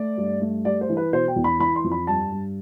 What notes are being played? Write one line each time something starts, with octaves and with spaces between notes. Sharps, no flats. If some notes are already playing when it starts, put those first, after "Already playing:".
Already playing: A3 D5
G2
A3
G3 D5
C5
E3
B4
B2 C5
G5
E2
B5
E3 B5
C6
F2
B5
G2 A5
G2